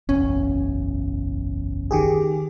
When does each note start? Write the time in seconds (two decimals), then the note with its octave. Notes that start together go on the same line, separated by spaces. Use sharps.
0.09 F#1 B1 E2 C#4
1.91 D#3 G4 G#4